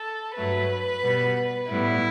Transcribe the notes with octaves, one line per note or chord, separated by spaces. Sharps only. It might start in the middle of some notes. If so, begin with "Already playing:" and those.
Already playing: A4
G2 F#3 A3 B4
B2 G3 B3
A2 G3 B3 E4